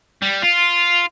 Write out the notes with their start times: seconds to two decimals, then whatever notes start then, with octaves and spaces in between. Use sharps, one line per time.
0.22 G3
0.42 F4